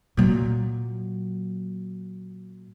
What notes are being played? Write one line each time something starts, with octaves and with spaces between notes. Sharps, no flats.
A#2 F#3